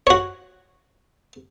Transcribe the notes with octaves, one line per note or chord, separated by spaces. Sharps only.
F#4 C#5